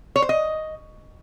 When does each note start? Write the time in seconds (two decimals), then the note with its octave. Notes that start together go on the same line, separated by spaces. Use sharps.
0.16 C#5
0.22 C5
0.29 D#5